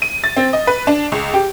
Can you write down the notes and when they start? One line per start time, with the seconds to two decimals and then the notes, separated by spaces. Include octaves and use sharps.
0.02 D#7
0.24 A6
0.37 C4
0.53 D#5
0.67 B4
0.87 D4
1.12 C#2
1.34 G4